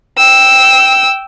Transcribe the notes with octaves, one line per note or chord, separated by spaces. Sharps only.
G5 E6